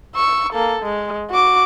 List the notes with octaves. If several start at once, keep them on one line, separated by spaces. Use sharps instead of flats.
C#6 E6
A#3 A4
G#3
F#4 D6